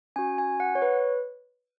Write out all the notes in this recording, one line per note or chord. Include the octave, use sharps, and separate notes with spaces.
C#4 F#4 G#5
G#5
F#5
C#5
B4